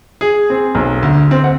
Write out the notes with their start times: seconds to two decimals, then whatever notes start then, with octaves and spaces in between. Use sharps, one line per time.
0.21 G#4
0.50 C4
0.75 B1
1.03 D2
1.31 C4
1.44 F#5